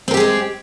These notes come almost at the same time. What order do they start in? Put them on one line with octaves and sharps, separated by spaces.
C4 A#4 G4 G#4 G#3